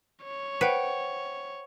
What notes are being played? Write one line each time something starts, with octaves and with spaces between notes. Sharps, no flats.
C#5
B4 C5 F#5 G5